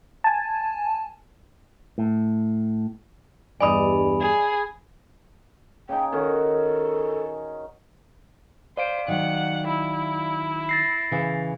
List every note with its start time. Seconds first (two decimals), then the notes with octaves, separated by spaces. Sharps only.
0.24 G#5 A5
1.98 A2
3.60 E2 G2 D5 D#5 G#5 B5 D#6
4.21 G#4
5.89 C#3 D#4 G5
6.13 D#3 C#4 F#4 A4
8.77 C5 D5 F5 D7
9.08 D#3 F#3 F#5
9.68 E4
10.69 A6 A#6 C7
11.12 C#3 E3